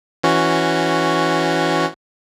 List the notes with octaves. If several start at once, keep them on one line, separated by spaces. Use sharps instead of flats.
E3 C#4 F#4